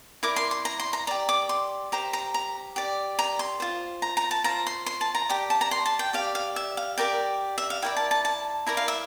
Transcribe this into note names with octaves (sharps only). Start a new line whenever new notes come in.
E4 A#4 D5 D6
C6
C6
A#5
C6
A#5
G4 D5 A#5
D6
C6
G4 C5 A#5
A#5
A#5
G4 D5
A#5
C6
F4 C5
A#5
A#5
A5
F4 C5 A#5
C6
C6
A5
A#5
G4 D5
A5
A#5
C6
A5
G5
G4 D5 F5
F5
E5
F5
G4 A#4 D5 G5
E5
F5
E4 A#4 D5 G5
A5
A5
A5
E4 A#4 D5 A#5
F5
E5